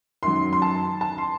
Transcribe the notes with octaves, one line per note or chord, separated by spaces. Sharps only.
F#2 D#3 F#3 C6
C6
A5
A5
C6